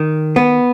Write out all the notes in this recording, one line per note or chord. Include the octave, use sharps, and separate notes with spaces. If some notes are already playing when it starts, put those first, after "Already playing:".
Already playing: D#3
B3